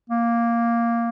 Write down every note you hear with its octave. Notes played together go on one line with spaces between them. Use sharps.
A#3